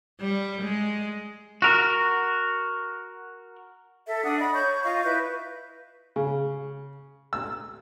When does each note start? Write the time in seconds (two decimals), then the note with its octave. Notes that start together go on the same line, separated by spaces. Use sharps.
0.20 G3
0.62 G#3
1.62 F#4 A#4
4.06 A4 E5
4.23 D4 F#5 D#6
4.39 D#5 B5
4.54 C#5 C#6 G6
4.84 F4 D#5 F5 C#6
5.03 E4 B4 G6
6.16 C#3
7.33 E6